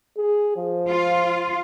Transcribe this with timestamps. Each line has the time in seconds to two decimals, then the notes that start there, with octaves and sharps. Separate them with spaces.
0.17 G#4
0.57 F3
0.88 F4